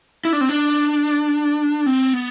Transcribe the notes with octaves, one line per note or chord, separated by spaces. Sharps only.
E4
D4
C4
D4
C4
B3